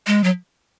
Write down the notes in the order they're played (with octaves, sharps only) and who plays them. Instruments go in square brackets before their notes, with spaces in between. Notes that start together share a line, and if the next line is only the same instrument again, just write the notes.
[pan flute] G#3
F#3